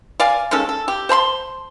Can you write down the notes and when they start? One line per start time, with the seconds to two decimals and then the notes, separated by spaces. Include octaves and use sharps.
0.20 D5 F5 G#5
0.51 D#3 G#3 C#4 A4
0.69 A4
0.88 G4
1.09 C5 A5 B5 C6